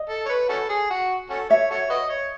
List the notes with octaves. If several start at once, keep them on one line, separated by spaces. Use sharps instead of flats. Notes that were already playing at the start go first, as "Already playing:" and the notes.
Already playing: D#5
A4
C#5
B4
C#4 F#4 A4
G#4
F#4
C#4 F#4 A4
C#5 E5
F#4 A4 C#5
F#4 B4 D#5
C#5